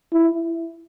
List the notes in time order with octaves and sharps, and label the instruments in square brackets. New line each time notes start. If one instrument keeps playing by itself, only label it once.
[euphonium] E4